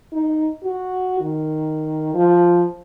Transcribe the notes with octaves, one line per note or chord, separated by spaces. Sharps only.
D#4
F#4
D#3
F3